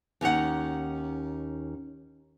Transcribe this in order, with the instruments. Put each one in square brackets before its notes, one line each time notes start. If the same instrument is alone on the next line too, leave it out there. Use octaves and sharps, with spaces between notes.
[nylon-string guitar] D#2 C#4 D#4 F#5